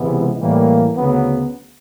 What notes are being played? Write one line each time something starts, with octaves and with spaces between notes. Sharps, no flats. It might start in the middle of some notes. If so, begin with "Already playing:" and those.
Already playing: C#2 C3 E3 G#3 B3
A2 E3 G3 A#3
D2 C#3 F#3 B3